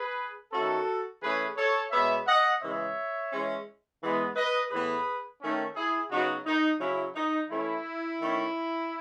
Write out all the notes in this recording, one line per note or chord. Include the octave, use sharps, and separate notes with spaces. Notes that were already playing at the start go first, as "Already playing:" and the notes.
Already playing: G#4 B4
D#3 A3 C#4 F#4 A4
E3 A3 C#4 G#4 B4
A4 C#5
B2 G#3 B3 C#5 E5
D#5 F#5
C#3 E3 G#3 C#5 E5
E3 G#3 C#4
E3 G#3 B3
B4 D#5
A2 E3 B3 G#4 B4
D#3 A3 C#4
E4 G#4
C#3 F#3 B3 D#4 F#4
D#4
C#3 F#3 C#4 E4
D#4
E3 A3 C#4 E4
D#3 A3 C#4